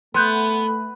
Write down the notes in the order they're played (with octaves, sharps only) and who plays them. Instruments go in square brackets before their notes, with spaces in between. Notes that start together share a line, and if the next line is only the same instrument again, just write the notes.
[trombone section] A3 [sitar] B3 [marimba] C6 F#6 G6